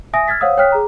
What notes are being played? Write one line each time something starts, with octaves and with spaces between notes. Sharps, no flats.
E5 G#5 D#6 A#6
E6 F6 G#6 A6 B6
C5 C#5 F5 F#5 D#6 E6
C#5 G5 D#6 F6 F#6 B6
G#4 A#5